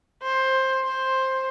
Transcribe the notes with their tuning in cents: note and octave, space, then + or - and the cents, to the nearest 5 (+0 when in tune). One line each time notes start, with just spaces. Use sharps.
C5 +15
C5 +10